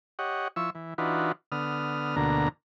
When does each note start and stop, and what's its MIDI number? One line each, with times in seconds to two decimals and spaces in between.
0.19 0.48 67
0.19 0.48 73
0.19 0.48 75
0.19 0.48 78
0.56 0.70 53
0.56 0.70 64
0.56 0.70 85
0.56 0.70 88
0.75 0.94 52
0.98 1.32 52
0.98 1.32 62
0.98 1.32 63
0.98 1.32 65
0.98 1.32 66
0.98 1.32 71
1.52 2.16 50
1.52 2.16 59
1.52 2.16 87
1.52 2.16 89
2.16 2.49 38
2.16 2.49 47
2.16 2.49 50
2.16 2.49 58
2.16 2.49 82